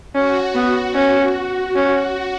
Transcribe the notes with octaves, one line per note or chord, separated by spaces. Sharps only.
C#4 F#4
B3
C#4
C#4